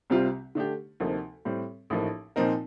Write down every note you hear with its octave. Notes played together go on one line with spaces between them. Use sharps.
C2 C3 G3 C4 F4
D3 A3 D4 G4
D2 C3 F3 A#3 D#4
A2 G3 C4
A1 A2 F3 A#3 D#4
A#2 F3 C4 D#4 A#4